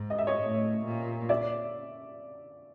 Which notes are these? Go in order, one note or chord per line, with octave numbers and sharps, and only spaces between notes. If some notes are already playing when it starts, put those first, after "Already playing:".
Already playing: G#2
D#5
E5
C#5 D#5
A2
A#2
D5 E5